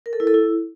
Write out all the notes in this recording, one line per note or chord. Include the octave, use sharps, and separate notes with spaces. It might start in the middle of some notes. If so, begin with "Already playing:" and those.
A#4
A4
E4
A4
E4